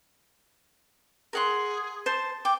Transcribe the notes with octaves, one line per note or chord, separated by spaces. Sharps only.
G#4 A#4 F#5 C6
C5 A5
G5 D6